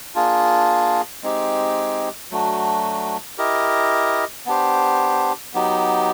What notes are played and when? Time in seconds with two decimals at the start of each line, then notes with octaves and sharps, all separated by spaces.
0.15 A#3 D4 F4 G#4
1.23 G#3 C4 D#4 G4
2.31 F#3 A3 D4 F#4
3.38 E4 G4 A#4 D#5
4.46 B3 D4 G4 C5
5.54 F#3 B3 D#4 G4